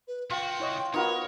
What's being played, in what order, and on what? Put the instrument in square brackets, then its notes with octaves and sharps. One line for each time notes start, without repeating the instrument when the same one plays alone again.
[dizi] B4
[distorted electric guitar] C2 F#4 [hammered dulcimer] F4 [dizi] G5
[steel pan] E4 C#5 D#5
[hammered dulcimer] B3 A#4 [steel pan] D#4 F4 F#4 [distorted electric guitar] C#5 [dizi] F#5